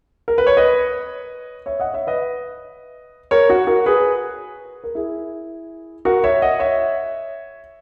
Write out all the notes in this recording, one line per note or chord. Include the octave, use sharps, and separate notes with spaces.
A#4
B4
C#5
B4 D#5
C#5 E5
D#5 F#5
C#5 E5
B4 D#5
A#4 C#5
F#4
F#4 A#4
G#4 B4
A#4
E4 G#4
F#4 A#4
C#5 E5
D#5 F#5
C#5 E5